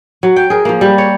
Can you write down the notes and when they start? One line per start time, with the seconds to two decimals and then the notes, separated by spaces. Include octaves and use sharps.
0.23 F#3
0.36 G5
0.50 G#4 A#4
0.65 F3 A#3
0.81 G3
0.98 C#5